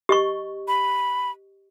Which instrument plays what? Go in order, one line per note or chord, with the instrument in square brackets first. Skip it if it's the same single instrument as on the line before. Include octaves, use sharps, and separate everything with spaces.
[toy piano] G4 D#5 C#6
[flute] B5